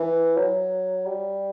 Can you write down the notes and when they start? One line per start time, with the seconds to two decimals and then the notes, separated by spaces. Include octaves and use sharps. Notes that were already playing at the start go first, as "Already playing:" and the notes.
Already playing: E3
0.37 F#3
1.06 G3